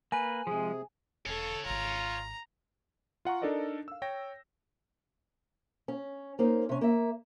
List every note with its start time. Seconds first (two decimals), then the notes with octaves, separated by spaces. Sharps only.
0.12 A#3 B4 G#5
0.47 C3 F3 G#3 G#4
1.26 E1 A4 C#5 F5
1.66 D#1 G#1 F4 A#5
3.25 F4 F#5 A#5 C#6
3.42 D4 D#4 A4 A#4 D5 D#5
3.88 F5 E6
4.02 C#5 G5 G6 A#6
5.88 C#4
6.39 A#3 C#4 D#4 C5
6.69 C3 C#4
6.81 A#3 E5